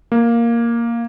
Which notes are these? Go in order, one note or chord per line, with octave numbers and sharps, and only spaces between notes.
A#3